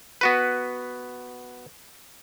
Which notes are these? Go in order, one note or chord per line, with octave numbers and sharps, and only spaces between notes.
B3 F#4 B4